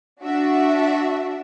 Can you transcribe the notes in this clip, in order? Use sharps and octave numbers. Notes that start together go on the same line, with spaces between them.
D4 F#4 E5